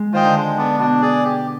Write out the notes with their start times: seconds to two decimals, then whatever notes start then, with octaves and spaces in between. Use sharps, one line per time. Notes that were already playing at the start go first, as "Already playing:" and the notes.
Already playing: G#3
0.13 D#3 F4 C5 D#5 G5
0.24 D3
0.35 G#3
0.57 B3 D4
0.79 B2 D4
1.02 G#4 D5
1.24 G4